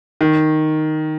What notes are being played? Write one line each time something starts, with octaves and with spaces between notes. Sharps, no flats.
D#3